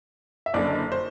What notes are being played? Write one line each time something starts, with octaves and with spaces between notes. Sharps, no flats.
E5
F#1 F#2 D3 D5
C5